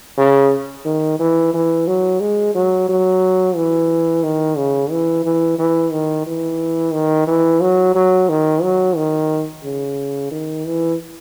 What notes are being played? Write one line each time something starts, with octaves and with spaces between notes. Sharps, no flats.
C#3
D#3
E3
E3
F#3
G#3
F#3
F#3
E3
D#3
C#3
E3
E3
E3
D#3
E3
D#3
E3
F#3
F#3
D#3
F#3
D#3
C#3
D#3
E3